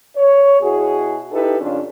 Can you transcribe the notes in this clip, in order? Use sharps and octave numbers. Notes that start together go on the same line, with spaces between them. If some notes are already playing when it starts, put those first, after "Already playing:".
C#5
B2 E4 F#4 G#4
D#4 E4 G4 A4 B4
F2 C#3 C#4 D4 F4